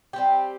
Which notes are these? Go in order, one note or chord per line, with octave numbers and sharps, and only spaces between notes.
G3 C4 G4